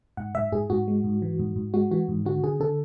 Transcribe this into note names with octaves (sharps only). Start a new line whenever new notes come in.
G#2 F#5
G#2 E5
G#2 G#4
G#2 F#4
G#3
G#2
E3
G#2
G#2
G#3 F#4
E3 F#4
G#2
D3 F#4
D3 G#4
D3 A4